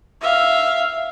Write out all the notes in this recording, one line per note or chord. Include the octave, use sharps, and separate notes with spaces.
E5 F5